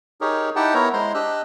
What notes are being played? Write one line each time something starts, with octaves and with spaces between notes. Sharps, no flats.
D#4 G4 G#4 A#4 C#5
D#4 E4 G4 F#5 G5 A5
B3 E4 A#4 C#5 A#5
G#3 E4 C5 A#5 C6
D4 G4 D#5 E6 F#6